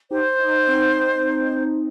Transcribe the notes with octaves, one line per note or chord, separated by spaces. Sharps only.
D#4 G4 C5
D#4
C4
D#4